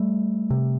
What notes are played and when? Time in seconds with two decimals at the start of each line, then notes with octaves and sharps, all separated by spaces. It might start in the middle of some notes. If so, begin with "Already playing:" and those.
Already playing: G3 A3
0.50 C3